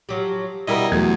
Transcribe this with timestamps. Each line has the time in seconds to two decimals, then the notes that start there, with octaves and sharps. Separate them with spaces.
0.09 F3 F#3 G4
0.67 B2 G3 E4 A#4 D#5
0.92 E2 F#3 A3 G#6